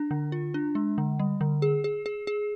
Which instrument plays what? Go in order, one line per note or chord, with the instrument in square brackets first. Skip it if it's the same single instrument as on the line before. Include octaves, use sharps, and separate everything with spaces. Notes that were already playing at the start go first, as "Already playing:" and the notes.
Already playing: [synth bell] D4
D3
F4
D4
G#3
D3
G3
D3
G#4
G#4
G#4
G#4